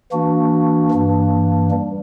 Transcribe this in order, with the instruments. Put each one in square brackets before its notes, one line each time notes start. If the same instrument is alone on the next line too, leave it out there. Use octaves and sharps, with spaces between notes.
[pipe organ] E3 A#3 D4 F#4
G2 E3 A#3 D4
G3